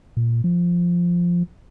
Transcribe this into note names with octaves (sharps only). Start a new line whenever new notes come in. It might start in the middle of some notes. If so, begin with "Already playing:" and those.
A#2
F3